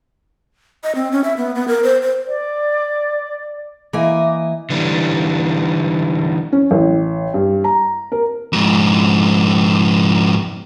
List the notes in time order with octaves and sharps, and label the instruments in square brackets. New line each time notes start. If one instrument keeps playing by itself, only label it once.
[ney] D#5
C4
C#4
E5
B3
B3
A#4
C5
C5
[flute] D5
[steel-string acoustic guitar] E3 A#3 D#5 E5 G#5
[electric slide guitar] D3 E3 G3
[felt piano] C#4
A1
G2
A#5
A#4
[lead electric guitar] F2 G#2